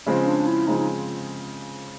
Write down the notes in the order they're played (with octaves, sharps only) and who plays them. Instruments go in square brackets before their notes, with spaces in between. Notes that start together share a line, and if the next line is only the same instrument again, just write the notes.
[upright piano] C#3 F3 G#3 C4 [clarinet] C#4
[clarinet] D4
E4
[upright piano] C#3 F3 G#3 C4 [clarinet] D#4
[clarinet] D#4